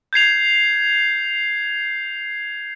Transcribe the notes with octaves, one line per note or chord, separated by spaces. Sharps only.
G6 G#6 C7 F7